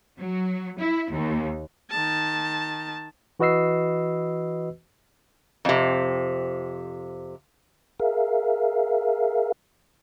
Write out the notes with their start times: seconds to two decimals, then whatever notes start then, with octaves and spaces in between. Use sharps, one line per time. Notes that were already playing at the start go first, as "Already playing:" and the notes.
0.19 F#3
0.80 E4
1.12 D#2
1.90 D#3 A5
3.40 E3 F#4 B4 D#5 E6 C7
5.65 F2 C3
8.00 G#4 A#4 E5 F5